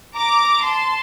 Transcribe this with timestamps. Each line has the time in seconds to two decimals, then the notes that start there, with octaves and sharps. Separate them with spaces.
0.14 A#5 D6
0.61 A5 C6